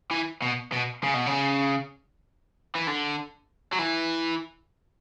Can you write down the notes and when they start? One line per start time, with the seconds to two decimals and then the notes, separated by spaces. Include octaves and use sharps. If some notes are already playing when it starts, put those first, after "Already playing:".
0.11 E3
0.42 B2
0.72 B2
1.04 C#3
1.14 B2
1.26 C#3
2.75 E3
2.87 D3
3.73 F#3
3.79 E3